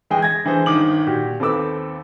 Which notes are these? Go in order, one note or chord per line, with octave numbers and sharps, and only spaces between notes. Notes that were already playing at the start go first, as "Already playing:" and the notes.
E3 G#3 G#4 G5
G#6 A#6
D3 E3 G#3 G#4 C5
G1 D#3 D6 F#7
A#2 F#4 G4
D#2 C4 A4 B4 D6 E6